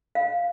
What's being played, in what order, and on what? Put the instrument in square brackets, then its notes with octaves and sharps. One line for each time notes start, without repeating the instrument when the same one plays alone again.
[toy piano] F5